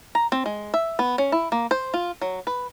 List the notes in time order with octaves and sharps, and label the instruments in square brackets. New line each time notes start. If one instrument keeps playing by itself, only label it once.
[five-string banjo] A#5
C4
G#3
E5
B3
C#4
E4
A#3
C5
F4
F#3
B4